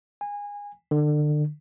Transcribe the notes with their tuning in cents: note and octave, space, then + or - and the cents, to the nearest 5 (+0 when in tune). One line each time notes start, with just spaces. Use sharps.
G#5 -25
D3 +30